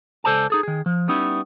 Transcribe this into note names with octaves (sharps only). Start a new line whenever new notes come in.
C#2 A4 C5 D5 G#5 A5
D#4 G#4 A4
D#3 G#4
F3
G3 B3 C#4 D#4 E4